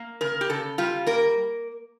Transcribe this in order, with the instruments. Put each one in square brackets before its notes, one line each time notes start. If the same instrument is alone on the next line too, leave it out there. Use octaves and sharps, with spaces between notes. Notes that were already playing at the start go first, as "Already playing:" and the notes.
Already playing: [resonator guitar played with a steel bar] A#3
C#3 A#4
G4
C#3 A4
G3 F4
A#3 A#4